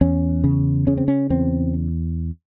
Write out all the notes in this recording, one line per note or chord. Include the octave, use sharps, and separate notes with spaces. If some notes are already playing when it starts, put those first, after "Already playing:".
E2 C#4
C#3
C#3 C#4
C4
C#4
E2 C4